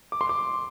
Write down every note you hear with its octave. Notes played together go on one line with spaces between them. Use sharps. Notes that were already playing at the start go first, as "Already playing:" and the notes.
D6
C6
D6